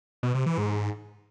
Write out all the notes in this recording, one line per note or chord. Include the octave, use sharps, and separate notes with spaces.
B2
C3
E3
G#2